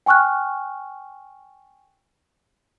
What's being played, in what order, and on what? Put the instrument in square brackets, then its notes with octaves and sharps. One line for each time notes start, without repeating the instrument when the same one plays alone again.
[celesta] G5 G#5 C#6 F6 F#6